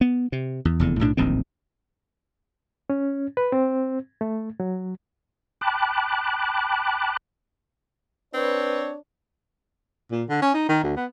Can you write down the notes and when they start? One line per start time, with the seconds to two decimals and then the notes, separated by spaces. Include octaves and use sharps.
0.01 B3
0.32 C3
0.65 E2
0.80 F1 E2 D3
0.99 B1 A2 C#4 D4
1.17 D1 A#1 D#3 C4
2.90 C#4
3.37 B4
3.52 C4
4.21 A3
4.60 F#3
5.61 G5 A5 B5 D6 F#6
8.34 C4 D4 B4 C#5
10.11 A#2
10.29 D3
10.42 C#4
10.54 D#4
10.69 D#3
10.83 D2
10.96 B3